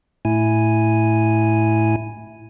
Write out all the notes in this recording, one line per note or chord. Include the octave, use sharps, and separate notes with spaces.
A2 E4 G#5